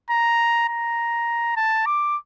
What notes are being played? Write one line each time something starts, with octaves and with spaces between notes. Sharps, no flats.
A#5
A#5
A5
D6